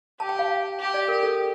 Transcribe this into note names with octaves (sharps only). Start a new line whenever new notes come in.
G4 A5
G5
F5
G4
D5
A#4
A4